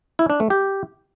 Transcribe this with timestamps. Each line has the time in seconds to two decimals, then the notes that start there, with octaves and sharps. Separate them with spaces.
0.19 E4
0.30 D4
0.40 A3
0.50 G4